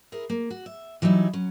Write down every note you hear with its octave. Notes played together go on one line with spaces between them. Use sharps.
E4 G#4 A#4
A#3
F#4
E5
E3 F#3 G3 D#4 E4
F#3 C#4